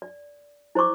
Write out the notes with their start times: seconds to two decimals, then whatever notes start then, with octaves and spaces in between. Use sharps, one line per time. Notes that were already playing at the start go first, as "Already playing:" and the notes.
0.02 D5
0.75 E4 C5 D5 C#6 D6